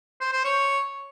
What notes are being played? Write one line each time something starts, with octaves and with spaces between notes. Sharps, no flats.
C5
C5
C#5